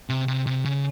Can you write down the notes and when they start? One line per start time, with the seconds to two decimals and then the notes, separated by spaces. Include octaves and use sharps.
0.09 C3
0.28 C3
0.46 C3
0.65 C#3